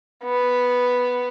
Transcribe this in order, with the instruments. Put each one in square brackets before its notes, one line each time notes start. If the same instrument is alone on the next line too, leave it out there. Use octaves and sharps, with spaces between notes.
[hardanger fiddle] B3